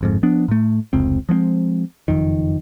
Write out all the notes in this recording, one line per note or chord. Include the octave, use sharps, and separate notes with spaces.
G1 F2 G#2
F3 B3 D4
A2 A3
F1 C#2 C4
F3 G#3 B3 C4
F#1 B1 F2 D#3